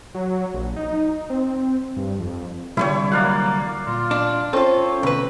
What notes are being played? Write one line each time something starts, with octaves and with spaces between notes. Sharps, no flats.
F#3
A#1
D#4
C4
G2
F2
C2 D3 G3 E4 C#5
F#3 A#3 D5 F5 F#5
A#2 F4
D4
C4 C#4 F4 A4 C#5
D2 B2 B4 A#5